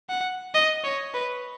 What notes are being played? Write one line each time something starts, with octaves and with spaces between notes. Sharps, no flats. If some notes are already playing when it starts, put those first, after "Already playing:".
F#5
D#5
C#5
B4